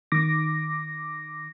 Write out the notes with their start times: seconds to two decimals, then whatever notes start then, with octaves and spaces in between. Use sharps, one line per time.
0.12 D#3 D6 A#6